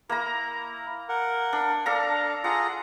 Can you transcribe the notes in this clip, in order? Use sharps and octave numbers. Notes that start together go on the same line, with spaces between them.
A#3 E4 A#5
A#4 F#5
D4
D4 A4 F5 A#5
F4 G#4 F#5 A#5